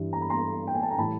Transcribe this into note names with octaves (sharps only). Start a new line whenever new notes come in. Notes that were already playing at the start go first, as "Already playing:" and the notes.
Already playing: G2 E3 G3
A#5
B5
A#5 C6
G5
G#5
A5
A#5
A2 E3 G3 A5 B5